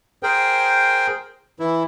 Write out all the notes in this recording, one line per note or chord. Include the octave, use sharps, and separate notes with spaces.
G#4 A#4 C5 G5
E3 E4